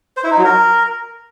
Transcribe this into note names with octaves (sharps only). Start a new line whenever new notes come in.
C5
E4
D#4
F#3
A#4